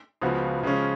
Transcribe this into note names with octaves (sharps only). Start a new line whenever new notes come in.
C#2 C#3 F3 B3 F#4
C#3 F3 G#3 C#4